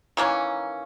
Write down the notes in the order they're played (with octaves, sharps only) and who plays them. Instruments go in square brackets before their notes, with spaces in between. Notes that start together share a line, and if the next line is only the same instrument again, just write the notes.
[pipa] D#3 E3 A#3 C#4